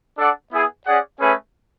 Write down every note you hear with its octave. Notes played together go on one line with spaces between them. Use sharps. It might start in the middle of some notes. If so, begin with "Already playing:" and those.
D4 A4 D5 F#5
B3 E4 G#4
C#4 G#4 D5 F#5
A3 C#4 G#4 B4